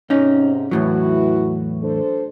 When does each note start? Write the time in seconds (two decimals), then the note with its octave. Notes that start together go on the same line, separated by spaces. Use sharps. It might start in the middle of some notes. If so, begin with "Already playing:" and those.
0.10 G#2 C3 C#4 D#4
0.71 E2 A2 E3 F#3 E4 F#4
1.83 D4 A4 C5